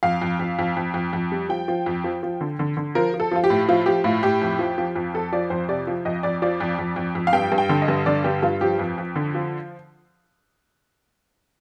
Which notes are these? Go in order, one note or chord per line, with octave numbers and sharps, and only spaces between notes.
F2 F5
F2
F2
F2
F2
F2
F2
G3
F3 G5
F3
F2
F3
F3
D3
D3
D3
F3 A#4
F3
A4
F3 F4
G4
A2
F3 F4
F3 G4
A2 F4
A2 G4
F2
F3
F3
F2
F2 A4
F3 D5
F2 C5
C3 D5
F3
F2 D#5
F2 D5
F3 D5
F2
F2
F2
F2
F5
G2 G5
G2
G5
D3
D#5
G2
D3 D5
G2 G4
G2 F4
F3 G4
F2
F2
D3
F3